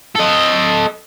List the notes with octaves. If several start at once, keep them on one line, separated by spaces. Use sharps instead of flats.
A4 D#5